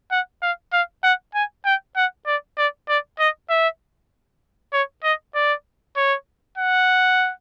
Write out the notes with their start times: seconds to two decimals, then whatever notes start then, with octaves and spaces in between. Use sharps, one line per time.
0.11 F#5
0.42 F5
0.73 F5
1.04 F#5
1.35 G#5
1.66 G5
1.96 F#5
2.27 D5
2.58 D5
2.89 D5
3.19 D#5
3.50 E5
4.73 C#5
5.04 D#5
5.35 D5
5.97 C#5
6.58 F#5